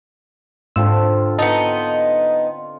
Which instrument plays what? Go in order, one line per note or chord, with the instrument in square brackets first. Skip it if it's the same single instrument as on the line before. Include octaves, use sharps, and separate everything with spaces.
[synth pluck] G#2 E6 [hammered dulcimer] D3 C4 F4
[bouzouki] B3 D#4 [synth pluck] A5 C#7